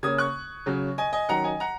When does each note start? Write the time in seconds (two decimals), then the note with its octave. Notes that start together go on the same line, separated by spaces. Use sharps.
0.03 C#3 A#3 C#4 D#6 G#6
0.18 C#6 F#6
0.66 C#3 F#3 C#4
0.98 D#5 G#5
1.13 D#5 G#5
1.29 D#3 F#3 C#4 F#5 A#5
1.44 D#5 G#5
1.60 F#5 A#5